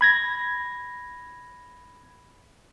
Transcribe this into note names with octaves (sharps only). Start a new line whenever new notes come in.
B5 G#6 A#6